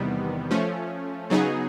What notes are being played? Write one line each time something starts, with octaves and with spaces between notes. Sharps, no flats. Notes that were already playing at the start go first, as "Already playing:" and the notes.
Already playing: E2 C3 D#3 G3 B3
F3 A3 C#4
C#3 F#3 B3 D#4 G#4